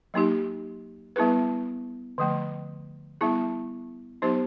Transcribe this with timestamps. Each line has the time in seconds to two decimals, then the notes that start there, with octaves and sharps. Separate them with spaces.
0.14 F#3 A#3 D#4 G4
1.16 G3 B3 E4 G#4 B4
2.18 D3 F3 A3
3.21 G3 B3 E4 G#4
4.22 F#3 B3 D#4 G4 C5